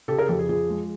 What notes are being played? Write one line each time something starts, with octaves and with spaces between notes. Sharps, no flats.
C#3 G4 A4
G#4 A#4
F2 G4 A4
G#4
F3 G#4
G#3